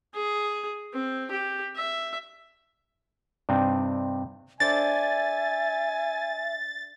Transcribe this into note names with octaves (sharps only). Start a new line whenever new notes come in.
G#4
C4
G4
E5
G2 C3 C4 D4 D#4
D4 A4 C5 E5 G#5 A6